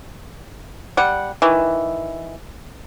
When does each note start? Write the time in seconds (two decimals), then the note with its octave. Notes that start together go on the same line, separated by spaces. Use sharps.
0.97 G3 F#5
1.42 D#3 E3